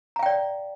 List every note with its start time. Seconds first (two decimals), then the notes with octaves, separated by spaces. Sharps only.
0.16 A#5
0.19 F5
0.23 G5
0.26 D5